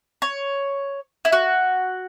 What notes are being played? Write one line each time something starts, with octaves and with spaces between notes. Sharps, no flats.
C#5
E4
F#4